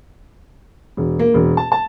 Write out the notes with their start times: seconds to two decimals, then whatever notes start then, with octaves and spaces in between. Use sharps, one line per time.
0.97 E1
1.19 A#3
1.34 E1
1.57 A5
1.72 A5